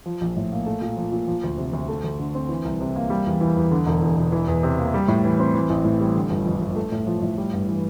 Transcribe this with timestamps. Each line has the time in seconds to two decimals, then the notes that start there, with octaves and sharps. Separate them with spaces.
0.06 F3
0.21 A#1
0.37 A2
0.52 A#3
0.66 A3
0.81 A#2
0.97 F3
1.12 A#2
1.27 F3
1.43 D2
1.57 C3
1.73 D2
1.88 A3
2.04 D2
2.19 D3
2.35 C4
2.49 E3
2.65 C2
2.81 C3
2.96 A#3
3.10 G3
3.26 E2
3.41 E3
3.57 E2
3.71 D3
3.86 E1
4.02 E2
4.17 E1
4.32 E3
4.48 E2
4.63 C3
4.78 A#3
4.94 G3
5.08 A2
5.24 E3
5.40 C4
5.54 E3
5.69 A1
5.84 A2
6.00 G3
6.15 D3
6.30 G1
6.45 F2
6.62 G1
6.76 A3
6.92 A2
7.07 F3
7.22 A2
7.38 G3
7.53 G2
7.68 E3